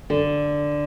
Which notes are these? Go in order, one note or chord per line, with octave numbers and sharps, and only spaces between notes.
D3